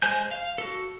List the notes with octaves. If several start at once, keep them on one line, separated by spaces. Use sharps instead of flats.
G#3 C5 G#5 G6
F5
F#4 A4